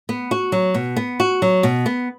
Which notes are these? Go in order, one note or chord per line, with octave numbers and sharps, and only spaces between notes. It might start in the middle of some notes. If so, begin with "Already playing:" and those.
B3
F#4
F#3
B2
B3
F#4
F#3
B2
B3